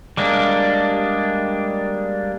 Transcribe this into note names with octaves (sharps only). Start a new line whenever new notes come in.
G3 G#3 A#3 D4